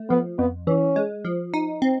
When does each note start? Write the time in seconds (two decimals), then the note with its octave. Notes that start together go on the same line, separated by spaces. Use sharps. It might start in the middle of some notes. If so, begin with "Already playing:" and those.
Already playing: A3
0.10 F3 B3
0.38 F2 B3
0.67 E3 C#4
0.96 G#3
1.25 F3
1.54 D#4
1.82 C4